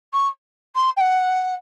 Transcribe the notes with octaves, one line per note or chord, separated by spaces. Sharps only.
C#6
C6
G5
F#5